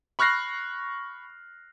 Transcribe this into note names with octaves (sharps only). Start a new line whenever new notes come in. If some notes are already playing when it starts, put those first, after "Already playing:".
B5 C#6 F6 F#6 A#6 C7